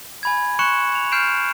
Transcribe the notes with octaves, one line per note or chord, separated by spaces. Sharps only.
G#5 B5 G#6
C6 C#6 F#6 C#7 E7 F#7
F7
F6 G6 C7 D7 E7 F7